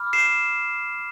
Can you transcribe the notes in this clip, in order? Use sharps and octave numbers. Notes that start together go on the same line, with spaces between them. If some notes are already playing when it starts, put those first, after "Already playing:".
Already playing: B5 D6 F6
C7 E7